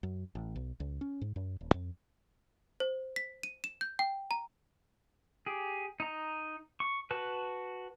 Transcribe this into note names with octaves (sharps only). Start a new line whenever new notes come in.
F#2
A1
B1
C#2
C#4
G#2
F#2
D#1
F2
C5
B6
D#7
E7
G6
G5
A#5
G4 G#4
D#4 A#5
C#6
F#4 B4 A5